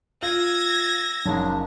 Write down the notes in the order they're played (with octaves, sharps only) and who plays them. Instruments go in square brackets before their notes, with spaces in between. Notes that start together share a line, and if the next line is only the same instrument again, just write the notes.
[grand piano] F4 [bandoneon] E6 [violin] G#6 A#6
[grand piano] F#1 C#3 D#4 [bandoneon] F#3 G#3 D4